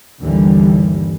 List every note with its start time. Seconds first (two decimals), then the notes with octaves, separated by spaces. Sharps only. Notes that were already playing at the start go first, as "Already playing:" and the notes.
0.20 G1 D#2 D3 E3 G3